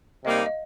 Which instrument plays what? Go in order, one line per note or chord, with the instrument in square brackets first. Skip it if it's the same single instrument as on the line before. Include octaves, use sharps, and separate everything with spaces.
[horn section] C3 G3 A#3 D#4 [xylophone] D#5
[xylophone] F5
D#5